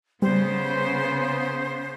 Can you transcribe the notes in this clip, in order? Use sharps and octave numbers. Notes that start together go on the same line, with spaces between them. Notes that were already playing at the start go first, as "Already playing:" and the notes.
C#3 G3 B3 C5